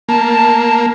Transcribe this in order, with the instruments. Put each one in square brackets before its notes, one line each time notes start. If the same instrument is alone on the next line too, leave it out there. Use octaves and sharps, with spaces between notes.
[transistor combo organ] A#3 [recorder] A5